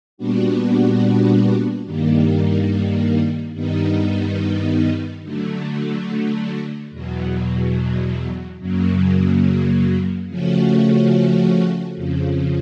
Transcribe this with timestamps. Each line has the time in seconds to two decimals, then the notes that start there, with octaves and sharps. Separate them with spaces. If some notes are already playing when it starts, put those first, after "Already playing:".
0.18 A#2 G3 B3 D4 F#4
1.86 G2 D#3 G3 A#3
3.54 G2 D#3 G3 B3 D#4
5.23 D3 F#3 A3
6.91 E2 B2 F#3
8.60 F#2 C#3 F#3 A#3
10.28 C#3 F3 A3 C#4 F#4
11.96 F2 C#3 F3